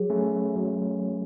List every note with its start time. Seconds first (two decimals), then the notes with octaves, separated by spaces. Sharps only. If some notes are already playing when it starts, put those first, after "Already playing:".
Already playing: F#3 G#4
0.10 A3 C#4
0.55 F#3